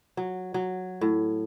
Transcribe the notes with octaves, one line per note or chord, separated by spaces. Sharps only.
F#3
F#3
A2